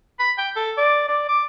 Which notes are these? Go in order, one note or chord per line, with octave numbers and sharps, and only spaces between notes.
B5
G5
A4
D5
D5
D6